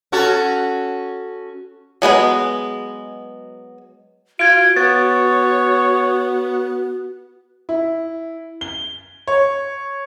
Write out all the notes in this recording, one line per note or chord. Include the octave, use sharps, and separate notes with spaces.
C#4 F#4 A4
F#3 G#3 B3 B4
F4 F#4 G#6 D7
B3 C#5 A6
E4
G7
C#5